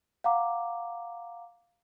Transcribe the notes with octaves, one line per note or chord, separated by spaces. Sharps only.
F5 F#5 A#5 D6